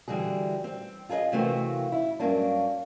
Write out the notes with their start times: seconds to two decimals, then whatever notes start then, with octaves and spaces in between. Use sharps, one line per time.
0.08 D3 E3 G3 F#4 G#4
0.64 C4
1.09 F4 G#4 A#4 D#5
1.32 C3 E3 A3 A#3 C4 F#4
1.92 E4
2.20 G2 F#3 A#3 C#4 D4